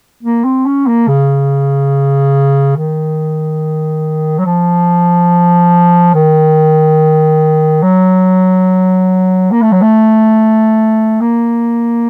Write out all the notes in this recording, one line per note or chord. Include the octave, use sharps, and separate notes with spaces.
A#3
C4
C#4
A#3
C#3
D#3
F#3
F3
D#3
F#3
A#3
A3
F#3
A3
A#3